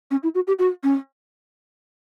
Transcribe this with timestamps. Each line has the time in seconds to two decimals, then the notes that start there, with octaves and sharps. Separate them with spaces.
0.11 C#4
0.23 E4
0.35 F#4
0.47 G4
0.59 F#4
0.84 C#4